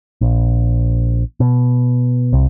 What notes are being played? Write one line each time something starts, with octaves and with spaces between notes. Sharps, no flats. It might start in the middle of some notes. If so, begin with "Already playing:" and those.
A#1
B2
C2